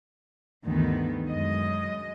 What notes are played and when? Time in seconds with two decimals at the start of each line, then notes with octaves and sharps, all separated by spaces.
0.65 D2 G2 D#3 E3 B3
1.27 F#2 G#3 D#5